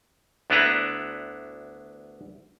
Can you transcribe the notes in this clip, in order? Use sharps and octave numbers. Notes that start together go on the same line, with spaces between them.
D2 B3 D4 E4 B4 A#5